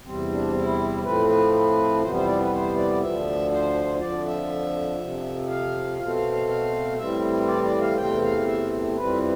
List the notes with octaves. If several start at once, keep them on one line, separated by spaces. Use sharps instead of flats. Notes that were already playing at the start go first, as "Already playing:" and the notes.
E2 C3 G3 C4
D4
E4
A2 F3 A3 C4 B4
B4
B4
F2 C3 E3 G3 B3 C5
C5
D5
B4
C5
D5
D2 D3 F3 E5
C5
F2 D3 F3 D5
E5
F2 C3 F3
F5
B2 A3 C4 F5
F5
F5
F5
A2 E3 G3 C4 E5
D5
D5
F5
E2 C3 E3 A3 C4 G5
F5
E5
F2 E3 G3 C4 B4